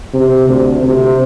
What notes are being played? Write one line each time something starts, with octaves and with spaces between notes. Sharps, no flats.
C3
D2
C3